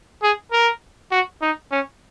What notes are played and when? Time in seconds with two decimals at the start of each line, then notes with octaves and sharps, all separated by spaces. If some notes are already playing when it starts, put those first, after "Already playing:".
0.23 G#4
0.52 A#4
1.12 F#4
1.42 D#4
1.71 C#4